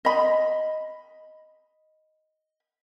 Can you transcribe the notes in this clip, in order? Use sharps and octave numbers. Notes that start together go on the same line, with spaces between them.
D#5 B5